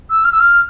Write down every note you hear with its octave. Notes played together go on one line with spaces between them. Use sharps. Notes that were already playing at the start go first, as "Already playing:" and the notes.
E6
F6
E6
F6